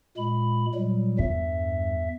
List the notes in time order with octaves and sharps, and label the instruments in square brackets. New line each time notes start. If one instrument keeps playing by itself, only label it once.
[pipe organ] A#2 G#3 B5
A#2 F#3 G3
[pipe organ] E2 E5 [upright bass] G2